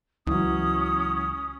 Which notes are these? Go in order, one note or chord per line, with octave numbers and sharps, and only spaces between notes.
C#2 E3 F#3 C#4 D#6